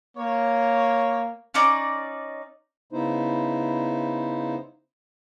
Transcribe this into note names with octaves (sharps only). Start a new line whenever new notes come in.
A#3 C#5
C#4 D#4 D5
C#3 B3 D#4 E4 C5